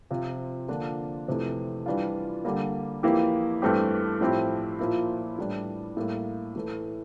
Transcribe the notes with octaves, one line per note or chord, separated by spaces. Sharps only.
C3 F3 C4 F4
D3 F3 A#3 D4 F4
F2 C3 E3 A3
E3 G3 D4 F4
D3 G3 A#3
F2 E3 A#3 E4 G4
G2 E3 A3 C4 G4
A2 F3 C4 E4 G4
A#2 F3 A#3 E4
A2 E3 G3 D4
A2 G3 A#3
A2 E3 A3